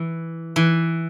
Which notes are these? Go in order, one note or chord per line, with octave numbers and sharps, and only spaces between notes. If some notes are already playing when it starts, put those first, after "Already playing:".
Already playing: E3
E3